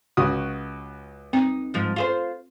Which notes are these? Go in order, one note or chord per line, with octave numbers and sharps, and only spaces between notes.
C#2 F#4 D#6
C4 D#4
G#2 F3
F4 G#4 C5